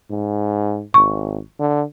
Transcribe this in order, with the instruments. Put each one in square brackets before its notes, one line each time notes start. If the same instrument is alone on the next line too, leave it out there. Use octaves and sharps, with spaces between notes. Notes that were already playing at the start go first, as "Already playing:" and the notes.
[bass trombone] G#2
[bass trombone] G#1 [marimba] C#6
[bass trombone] D3